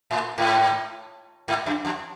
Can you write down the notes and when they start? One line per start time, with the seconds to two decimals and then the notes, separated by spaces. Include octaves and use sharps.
0.11 A2
0.38 G#2
1.48 G#2
1.66 F#2
1.85 F2